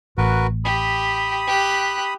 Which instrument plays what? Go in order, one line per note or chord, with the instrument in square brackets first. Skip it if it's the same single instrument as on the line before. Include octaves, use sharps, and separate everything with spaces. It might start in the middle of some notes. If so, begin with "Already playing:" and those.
[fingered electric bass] A1 [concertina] F#4 A#4 B4
[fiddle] G4 [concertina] B5 D#6
[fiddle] G4 F#6